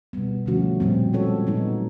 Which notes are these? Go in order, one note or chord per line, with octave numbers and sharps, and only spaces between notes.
B2 G3 B3
D3 F3 A3 C#4 F#4
A#2 G3 C4
G#3 C#4 F#4 A4 C#5
A#2 F#3 B3 D#4